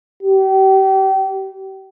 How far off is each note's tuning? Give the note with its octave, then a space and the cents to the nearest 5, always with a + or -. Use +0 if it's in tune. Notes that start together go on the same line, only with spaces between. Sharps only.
G4 -35